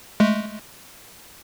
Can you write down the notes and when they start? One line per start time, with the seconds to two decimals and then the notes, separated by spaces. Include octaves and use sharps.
0.20 G#3 A3